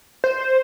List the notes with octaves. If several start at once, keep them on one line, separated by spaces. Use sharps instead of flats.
C5